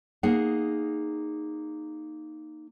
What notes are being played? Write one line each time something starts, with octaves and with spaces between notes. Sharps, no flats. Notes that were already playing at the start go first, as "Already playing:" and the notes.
A#3 D#4 G#4 F#5